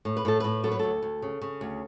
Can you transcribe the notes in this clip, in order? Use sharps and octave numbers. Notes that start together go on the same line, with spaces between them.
A2
B4
A2 A4
A2 B4
F#3 A4
B4
D2 A4
D2
C#3
C#3
D2